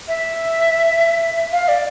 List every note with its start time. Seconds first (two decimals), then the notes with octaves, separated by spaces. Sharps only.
0.08 E5
1.52 F5
1.68 D5